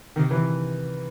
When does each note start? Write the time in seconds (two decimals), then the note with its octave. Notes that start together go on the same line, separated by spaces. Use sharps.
0.16 C3 D#3
0.31 E3